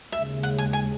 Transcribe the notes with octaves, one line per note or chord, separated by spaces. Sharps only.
D#2 C#3 G#3 E5
F#5
G#5
G#5